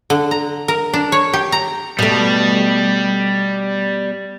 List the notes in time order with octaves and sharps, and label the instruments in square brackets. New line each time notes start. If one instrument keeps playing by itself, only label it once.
[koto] D3
A#5
A#4
D4
C#5
G4
A#5
[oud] B2 A3 [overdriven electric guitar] G3